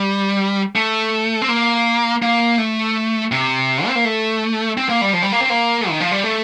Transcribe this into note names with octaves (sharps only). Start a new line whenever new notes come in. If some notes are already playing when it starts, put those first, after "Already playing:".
Already playing: G3
A3
C4
A#3
A#3
A3
C3
C4
A#3
A3
C4
A#3
G3
F3
G3
A#3
C4
A#3
D#3
F3
G3
A3